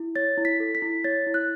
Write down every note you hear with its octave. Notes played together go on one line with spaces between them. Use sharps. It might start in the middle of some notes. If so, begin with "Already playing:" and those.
Already playing: E4
C#5 A6
E4
B6
A4
B6
E4
C#5 A6
E4
F#6